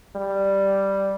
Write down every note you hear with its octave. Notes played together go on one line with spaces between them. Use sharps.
G3